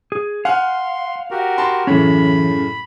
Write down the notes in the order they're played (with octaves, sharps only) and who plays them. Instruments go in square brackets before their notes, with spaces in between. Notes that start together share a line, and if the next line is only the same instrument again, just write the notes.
[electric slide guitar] G#4
[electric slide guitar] F5 [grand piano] F#5 G#5 F6 [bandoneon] C6
[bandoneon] F#4 G4 A#4
[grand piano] A5 B5 C6
[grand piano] F#2 A2 C#3 [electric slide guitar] E3 C#4 [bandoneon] B5